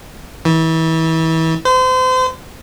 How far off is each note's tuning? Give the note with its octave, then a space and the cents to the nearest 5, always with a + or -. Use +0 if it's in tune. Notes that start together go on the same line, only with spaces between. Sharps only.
E3 -30
C5 -35